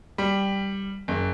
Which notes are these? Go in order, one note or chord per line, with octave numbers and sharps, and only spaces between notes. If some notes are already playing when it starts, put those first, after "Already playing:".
G3
F#1